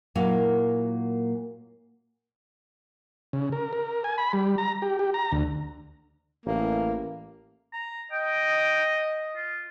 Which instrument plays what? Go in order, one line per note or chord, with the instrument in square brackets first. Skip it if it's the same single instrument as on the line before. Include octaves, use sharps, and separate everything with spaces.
[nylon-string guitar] A#2 F#3 A#3 E4 A#4 F5
[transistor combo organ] C#3
A#4
A#4
G#5
B5
G3
A#5
G4
G4
A#5
D2
[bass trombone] A1 [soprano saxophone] A#3
[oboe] A#5
[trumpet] D#5 [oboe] G5
[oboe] F4